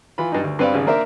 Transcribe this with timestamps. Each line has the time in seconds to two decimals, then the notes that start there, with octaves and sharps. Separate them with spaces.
0.18 E3 F4 B5
0.32 G2 D#4
0.43 D2
0.59 G2 C4 B4 D5 F5
0.74 G#1 C#3
0.87 A#3 D4 A#4 C5 D5 E5